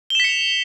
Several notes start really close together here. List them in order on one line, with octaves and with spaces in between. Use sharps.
G7 E7 B6 C#7 F7